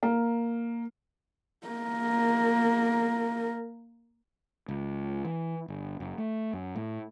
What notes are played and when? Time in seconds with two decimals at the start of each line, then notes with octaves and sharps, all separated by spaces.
0.03 A#3
1.67 A#3 A#4
4.69 C#2
5.25 E3
5.68 G1
6.00 F#1
6.18 A3
6.53 F#2
6.76 A2